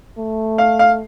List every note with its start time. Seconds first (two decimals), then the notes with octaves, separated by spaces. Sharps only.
0.17 A3
0.58 F5
0.79 F5